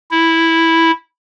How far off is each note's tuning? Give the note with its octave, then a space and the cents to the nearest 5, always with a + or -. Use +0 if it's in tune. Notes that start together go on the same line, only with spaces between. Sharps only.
E4 -5